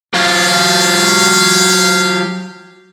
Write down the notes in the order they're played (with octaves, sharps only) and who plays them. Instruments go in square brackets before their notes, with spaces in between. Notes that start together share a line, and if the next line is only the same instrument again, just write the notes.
[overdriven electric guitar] F#3 F4 [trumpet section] C#4 G4 F5